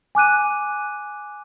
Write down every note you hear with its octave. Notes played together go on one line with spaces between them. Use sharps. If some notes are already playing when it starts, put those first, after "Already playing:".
G#5 D6 F#6 D#7